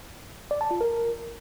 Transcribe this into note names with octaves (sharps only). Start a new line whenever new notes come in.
D5
A5
F4
A#4